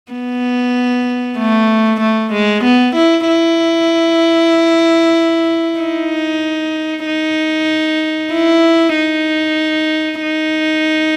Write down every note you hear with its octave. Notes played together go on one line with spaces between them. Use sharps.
B3
A3
A3
G#3
B3
E4
E4
D#4
D#4
E4
D#4
D#4